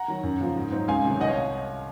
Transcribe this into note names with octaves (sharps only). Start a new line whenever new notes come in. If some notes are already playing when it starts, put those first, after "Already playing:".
Already playing: F#5 A#5
D#3 F#3
F#2
C#3 F3
G#2
F#3 C4 D#4
C#2 F5 G#5
C3 D#3 F#3
C2 D#5 F#5
C#5 F5